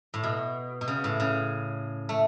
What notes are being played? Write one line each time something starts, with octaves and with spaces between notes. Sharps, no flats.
A2
B2
B2
C#3
A2
C#3
A3